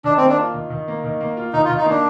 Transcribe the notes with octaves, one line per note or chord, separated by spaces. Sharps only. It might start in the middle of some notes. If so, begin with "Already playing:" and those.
D#3 D4
A#3 C4
D4
F4
D#3
D#3
A#3
D#3
A#3
F4
D#3 D#4
F4
D#3
D#4
A#3 D4